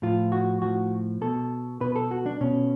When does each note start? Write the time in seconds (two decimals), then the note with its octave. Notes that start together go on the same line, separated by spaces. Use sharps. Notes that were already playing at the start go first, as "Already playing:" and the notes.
0.02 A2 F3 F4
0.32 F#4
0.61 A2 F3 F#4
1.21 B2 A4
1.81 B2 B4
1.96 A4
2.11 F#4
2.26 D4
2.41 B2 C#4